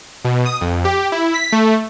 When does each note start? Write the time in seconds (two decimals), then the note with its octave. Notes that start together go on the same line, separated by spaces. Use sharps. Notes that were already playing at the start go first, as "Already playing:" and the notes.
0.25 B2
0.46 D#6
0.61 F2
0.85 G4
1.12 E4
1.34 B6
1.52 A3